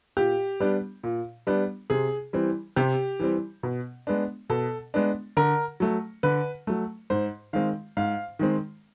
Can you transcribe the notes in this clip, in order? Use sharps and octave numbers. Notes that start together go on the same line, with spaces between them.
A#2 G4
G3 B3 D4
A#2
G3 B3 D4
C3 G#4
E3 G3 C4
C3 G4
E3 G3 C4
B2
G#3 B3 D4
B2 A4
G#3 B3 D4
D3 A#4
F#3 A3
D3 B4
F#3 A3
G#2 C5
D#3 G#3 C4 F5
G#2 F5
D#3 G#3 C4